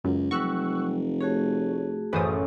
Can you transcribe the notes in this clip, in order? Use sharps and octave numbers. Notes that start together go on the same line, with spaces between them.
C#2 F#2
F1 F#3 G3 C#6 E6 F#6
A3 F#4 G#4 C#5
A1 F#2 B4 C5 D#6